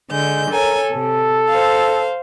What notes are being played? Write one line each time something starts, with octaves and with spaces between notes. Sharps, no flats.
D3 G#3 G6
A4 A#4 C#5 G#5
C3 A4
C5 F5